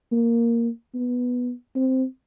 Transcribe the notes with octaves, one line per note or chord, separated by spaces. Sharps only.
A#3
B3
C4